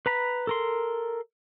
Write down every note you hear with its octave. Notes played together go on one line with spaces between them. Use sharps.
B4 A#5 B5
A4 A#4 C6